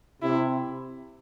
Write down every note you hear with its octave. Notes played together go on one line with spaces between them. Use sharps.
C3 E4